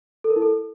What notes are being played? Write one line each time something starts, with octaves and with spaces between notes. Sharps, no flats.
A4
A#4
E4
A4